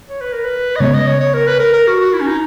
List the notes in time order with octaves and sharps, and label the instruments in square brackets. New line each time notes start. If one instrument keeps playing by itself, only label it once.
[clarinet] C#5
B4
A#4
B4
D#5
[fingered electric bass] C#3 G#3 B3 [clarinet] C#5
[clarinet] D#5
C#5
C#5
A#4
B4
A#4
A#4
F#4
F#4
E4
C#4
D#4